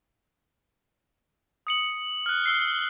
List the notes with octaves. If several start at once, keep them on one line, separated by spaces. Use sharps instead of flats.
D#6 C#7 F#7
F6 F#6
E6 C7 G7